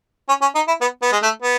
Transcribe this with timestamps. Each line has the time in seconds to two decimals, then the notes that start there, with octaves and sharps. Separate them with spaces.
0.28 C#4
0.41 C#4
0.55 D#4
0.67 E4
0.81 B3
1.02 B3
1.12 G#3
1.22 A3
1.42 B3